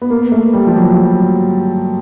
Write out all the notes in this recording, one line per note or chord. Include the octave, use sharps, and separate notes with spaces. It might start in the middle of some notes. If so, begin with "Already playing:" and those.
B3
A#3
A3
G3
F3
F#3